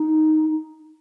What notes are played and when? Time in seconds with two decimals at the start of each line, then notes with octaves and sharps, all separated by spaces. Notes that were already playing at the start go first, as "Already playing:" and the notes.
Already playing: D#4